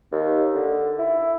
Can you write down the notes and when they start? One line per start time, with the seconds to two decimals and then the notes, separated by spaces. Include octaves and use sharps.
0.12 D#2
0.54 D3
0.99 E4